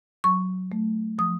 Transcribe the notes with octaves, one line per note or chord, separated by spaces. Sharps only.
F#3 C#6
A3
F3 D#6